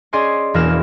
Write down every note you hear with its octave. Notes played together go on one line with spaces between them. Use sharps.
C#4 G#4 D5 D#5 G#5 C6
E1 E2 A#3 A#4 F6 E7